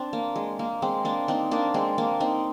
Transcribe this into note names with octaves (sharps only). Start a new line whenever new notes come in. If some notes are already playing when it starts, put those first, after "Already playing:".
Already playing: C4 D4
A#3
G#3
A#3
G#3 C4
A#3 D4
C4 D#4
A#3 D4
G#3 C4
A#3 D4
C4 D#4